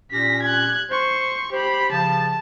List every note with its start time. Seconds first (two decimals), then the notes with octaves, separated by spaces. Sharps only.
0.11 A#2 C#4 G4 A#6 B6
0.42 F#6 G#6
0.91 C5 C6 C#6
1.52 G4 C5 B5
1.92 C#3 F3 A5